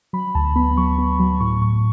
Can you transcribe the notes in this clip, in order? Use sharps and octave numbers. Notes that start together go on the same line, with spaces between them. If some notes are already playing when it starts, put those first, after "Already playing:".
F#3 B5
D2 A5
B3 B5
F#3 C#6
B3
F#3
A2 C#6
A2 C#6